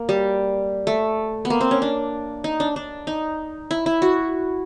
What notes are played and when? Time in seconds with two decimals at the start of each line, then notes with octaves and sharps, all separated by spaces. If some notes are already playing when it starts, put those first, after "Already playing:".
Already playing: A#3
0.09 G3
0.87 A3
1.45 B3
1.50 A#3
1.61 C4
1.71 C#4
1.82 D4
2.44 D#4
2.60 D4
2.76 D4
3.07 D#4
3.71 E4
3.86 E4
4.02 F#4